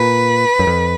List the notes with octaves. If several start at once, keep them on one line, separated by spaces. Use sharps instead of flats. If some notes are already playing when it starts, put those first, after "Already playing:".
Already playing: A#2 B4
F#2
F2